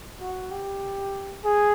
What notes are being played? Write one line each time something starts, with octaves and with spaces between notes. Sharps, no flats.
F#4
G4
G#4